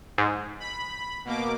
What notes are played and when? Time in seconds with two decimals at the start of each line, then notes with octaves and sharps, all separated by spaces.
0.18 G#2
0.60 B5
1.25 B2 A#3 D6